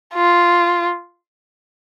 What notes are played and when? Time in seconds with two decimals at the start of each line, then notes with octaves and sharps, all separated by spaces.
0.14 F4